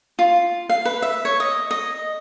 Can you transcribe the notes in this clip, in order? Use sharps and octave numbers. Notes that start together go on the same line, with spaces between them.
F4
F5
B4
E5
C#5
D#5
D#5